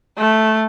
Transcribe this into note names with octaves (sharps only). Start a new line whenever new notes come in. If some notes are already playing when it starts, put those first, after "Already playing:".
A3